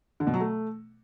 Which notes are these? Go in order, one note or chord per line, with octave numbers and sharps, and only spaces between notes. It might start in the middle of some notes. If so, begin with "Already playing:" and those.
D3
B2
F#3
A3